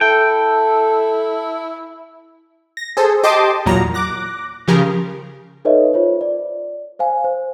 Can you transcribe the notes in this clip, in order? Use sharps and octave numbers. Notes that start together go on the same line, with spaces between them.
E4 A4 G5
A#6
G#4 A4 C5
G4 D#5 A5 C6 D6 D#6
E2 A#2 F#3 A#5
D6 F#6 A#6
C#3 F3 G4 A#4
D#4 A4 B4 C#5 D#5 E5
F4 C5 C#5
D5
C5 F5 G#5
C5